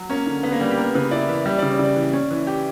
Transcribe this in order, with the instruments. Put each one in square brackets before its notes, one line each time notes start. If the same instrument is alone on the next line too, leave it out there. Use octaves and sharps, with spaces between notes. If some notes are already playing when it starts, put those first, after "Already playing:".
Already playing: [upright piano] F#3
[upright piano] A#3 [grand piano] C#4
[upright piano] D3
[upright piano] D3 [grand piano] B3
[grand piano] A#3
[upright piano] G3 [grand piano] B3
[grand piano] G4
[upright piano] B3 [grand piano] A#4
[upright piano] C#3 [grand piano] B4
[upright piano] E4 [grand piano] D5
[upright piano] E3 [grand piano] E5
[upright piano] G3 [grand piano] E5
[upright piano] C#3 [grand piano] D5
[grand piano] C#5
[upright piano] C#3 [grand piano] D5
[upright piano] E3
C#4
E3
G4